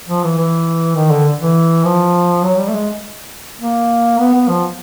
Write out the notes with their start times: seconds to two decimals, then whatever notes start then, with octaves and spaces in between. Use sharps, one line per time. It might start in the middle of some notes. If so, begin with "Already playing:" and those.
0.08 F3
0.24 E3
0.37 E3
0.96 D#3
1.11 D3
1.40 E3
1.84 F3
2.44 F#3
2.58 G3
2.68 A3
2.73 G#3
3.61 A#3
4.20 B3
4.34 B3
4.48 F3